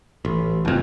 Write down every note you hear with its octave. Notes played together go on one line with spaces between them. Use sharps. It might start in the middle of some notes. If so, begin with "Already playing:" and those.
A1
F#1 F2